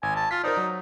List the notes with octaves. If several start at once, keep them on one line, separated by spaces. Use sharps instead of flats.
G#1 G#5
A5
F4 B6
D#4 A#4 C5 D5
F#3